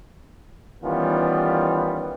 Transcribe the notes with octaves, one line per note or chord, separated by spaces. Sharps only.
D#3 E3 G3 B3 C#4 F4